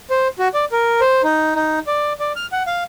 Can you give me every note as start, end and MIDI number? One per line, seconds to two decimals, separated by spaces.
0.10 0.28 72
0.39 0.48 66
0.54 0.65 74
0.72 1.01 70
1.01 1.22 72
1.23 1.54 63
1.55 1.79 63
1.87 2.13 74
2.20 2.32 74
2.36 2.46 89
2.52 2.63 78
2.67 2.84 77